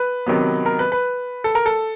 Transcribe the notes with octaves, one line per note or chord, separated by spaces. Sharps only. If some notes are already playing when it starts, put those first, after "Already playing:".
Already playing: B4
C3 D#3 F#3 B3
A#4
B4
B4
A4
A#4
A4